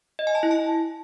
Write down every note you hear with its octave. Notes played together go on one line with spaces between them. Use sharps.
D#5
G#5
A5
E4
A5